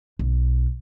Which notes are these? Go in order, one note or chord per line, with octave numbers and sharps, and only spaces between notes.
B1